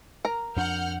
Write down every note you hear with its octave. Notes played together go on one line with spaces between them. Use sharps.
A#4 A#5
F2 F3 D4 F#5 F6 G6